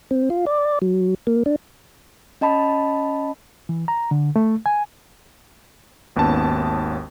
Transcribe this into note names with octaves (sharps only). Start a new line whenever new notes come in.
C4
F4
D5
F#3
A#3
D4
C#4 D#5 A5 B5
E3
A#5
D3
A3
G#5
G#1 D#2 B3 C#4 A5